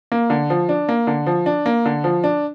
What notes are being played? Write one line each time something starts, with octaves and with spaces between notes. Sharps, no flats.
A#3
D3
F3
D4
A#3
D3
F3
D4
A#3
D3
F3
D4